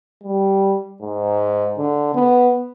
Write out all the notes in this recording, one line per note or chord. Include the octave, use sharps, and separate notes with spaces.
G3
G#2
D3
B3